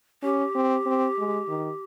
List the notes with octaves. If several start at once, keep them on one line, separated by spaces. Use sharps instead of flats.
C#4 G4
C4
C4
G#3
D#3